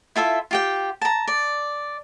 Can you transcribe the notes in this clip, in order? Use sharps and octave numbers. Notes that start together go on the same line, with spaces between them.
E4 F4 A4 E5
F4 G4 G5
A5 A#5
D5